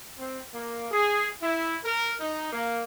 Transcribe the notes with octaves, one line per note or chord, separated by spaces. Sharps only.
C4
A#3
G#4
E4
A#4
D#4
A#3